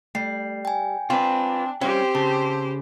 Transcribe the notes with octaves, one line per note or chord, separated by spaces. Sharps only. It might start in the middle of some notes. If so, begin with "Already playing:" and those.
G3 A3 C7
G5 G#5
C4 D4 F4 B4
G3 C4 C#4 G4 C5
C#3 A5